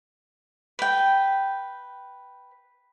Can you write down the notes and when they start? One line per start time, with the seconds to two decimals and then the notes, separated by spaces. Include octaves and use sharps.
0.79 B4 G5